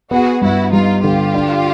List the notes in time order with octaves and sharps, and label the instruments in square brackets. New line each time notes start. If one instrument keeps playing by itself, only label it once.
[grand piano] B3 [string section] F#4 G#4
[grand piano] G2 [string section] E4 F#4
[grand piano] G3 [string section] D#4 F4
[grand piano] D3 [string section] F4 G4
[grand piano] D4